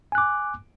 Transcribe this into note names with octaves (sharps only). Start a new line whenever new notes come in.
G#5 D6 F#6